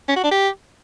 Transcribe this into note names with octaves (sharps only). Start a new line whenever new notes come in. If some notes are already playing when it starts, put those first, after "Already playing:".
C#4
F#4
D4
G4